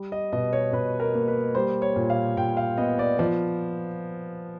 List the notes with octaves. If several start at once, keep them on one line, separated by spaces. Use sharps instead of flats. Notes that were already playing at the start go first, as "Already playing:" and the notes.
Already playing: G3
D#5
B2 D#5
C#5
B2 B4
A#4
A#3
B4
G3 C5
C#5
A#2
F5
A#2 G5
F5
B3 D#5
D5
F3 D5